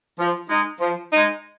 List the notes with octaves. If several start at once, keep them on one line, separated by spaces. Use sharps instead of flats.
F3
G#3 D#4
F3
G#3 D#4